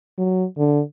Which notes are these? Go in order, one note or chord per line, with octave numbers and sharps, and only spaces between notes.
F#3
D3